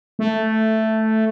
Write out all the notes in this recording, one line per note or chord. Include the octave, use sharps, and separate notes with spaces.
A3